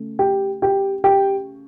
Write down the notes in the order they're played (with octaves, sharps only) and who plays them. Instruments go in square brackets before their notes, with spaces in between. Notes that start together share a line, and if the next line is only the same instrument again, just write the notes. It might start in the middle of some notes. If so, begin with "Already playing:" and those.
Already playing: [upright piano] C#3 A3
G4 G5
G4 G5
G4 G5